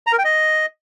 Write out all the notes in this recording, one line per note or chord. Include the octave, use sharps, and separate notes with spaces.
A#5
A#4
G5
D#5